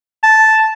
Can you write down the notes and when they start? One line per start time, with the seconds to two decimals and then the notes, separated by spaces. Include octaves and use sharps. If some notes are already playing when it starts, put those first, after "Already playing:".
0.23 A5